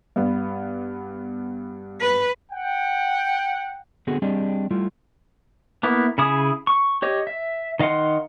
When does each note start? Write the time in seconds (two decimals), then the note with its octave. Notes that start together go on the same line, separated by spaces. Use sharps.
0.16 G2 B3
2.01 B4
2.52 F#5 G5
4.07 D3 B3 C4 F#4 G#4 A4
4.22 G3 C4 D4 G4 G#4 D#5
4.71 G3 A3 E4 F4
5.83 A#3 B3 E4
6.18 C#3 E4 G#4 D#6
6.67 C#6
7.02 G4 C#5 D#5
7.27 E5
7.80 D#3 D#5 F5 F#5 C6